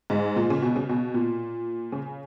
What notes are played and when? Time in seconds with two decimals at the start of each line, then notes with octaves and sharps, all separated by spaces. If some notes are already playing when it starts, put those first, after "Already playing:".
0.10 G#2
0.36 A#2
0.50 C#3
0.62 B2
0.76 C#3
0.89 B2
1.14 A#2
1.92 C#3